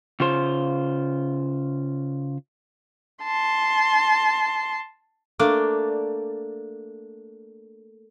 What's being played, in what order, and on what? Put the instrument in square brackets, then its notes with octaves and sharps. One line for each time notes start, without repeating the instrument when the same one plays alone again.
[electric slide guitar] C#3 F4 C5
[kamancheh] A5 C6
[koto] A3 A#3 D4 D5